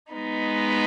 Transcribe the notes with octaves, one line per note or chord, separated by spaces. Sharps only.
G#3 B3 D#4